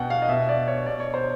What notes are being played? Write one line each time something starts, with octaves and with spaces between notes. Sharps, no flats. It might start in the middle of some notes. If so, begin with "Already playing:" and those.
Already playing: B2 F#5 G5
F5
D#5
B2 E5
D5
C#5
B2 D5
C#5
C5